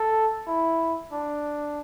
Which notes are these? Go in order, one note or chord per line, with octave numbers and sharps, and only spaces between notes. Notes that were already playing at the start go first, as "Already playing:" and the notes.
Already playing: A4
E4
D4